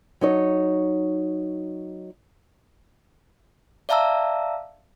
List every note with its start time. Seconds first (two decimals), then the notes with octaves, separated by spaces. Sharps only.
0.21 F#3 D#4 C#5
3.89 D5 E5 F5 A5 A#5 E6